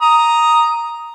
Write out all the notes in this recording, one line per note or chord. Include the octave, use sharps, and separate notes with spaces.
A#5 D#6